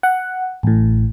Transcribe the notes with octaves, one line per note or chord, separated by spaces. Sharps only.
F#5
A1 A2